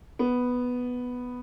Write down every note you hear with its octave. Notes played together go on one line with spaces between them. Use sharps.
B3